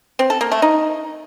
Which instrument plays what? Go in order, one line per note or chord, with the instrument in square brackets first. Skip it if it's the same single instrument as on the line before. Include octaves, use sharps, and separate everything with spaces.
[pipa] C4
A4
A#3
A3
D#4